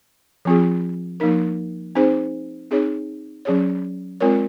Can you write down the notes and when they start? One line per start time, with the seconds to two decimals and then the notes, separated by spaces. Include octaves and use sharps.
0.45 F3 C4 F4 G#4
1.20 F3 A#3 D#4 A#4
1.95 C4 D#4 G#4 C5
2.71 C4 D#4 G#4 C#5
3.45 F#3 C#4 G#4 C#5
4.21 G#3 C4 F4 A#4 C#5